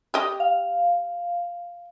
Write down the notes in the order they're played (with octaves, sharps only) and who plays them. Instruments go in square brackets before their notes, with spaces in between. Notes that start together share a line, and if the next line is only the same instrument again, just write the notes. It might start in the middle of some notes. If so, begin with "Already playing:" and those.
[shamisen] G4 D#5
[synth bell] F5